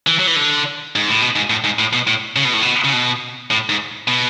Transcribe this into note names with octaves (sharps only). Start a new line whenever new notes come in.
E3
F#3
E3
D3
G#2
A2
B2
G#2
A2
G#2
A2
B2
A2
C#3
B2
A2
B2
C#3
B2
A2
G#2
B2